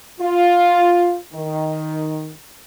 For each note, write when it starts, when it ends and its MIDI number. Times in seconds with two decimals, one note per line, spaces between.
0.21 1.16 65
1.34 2.32 51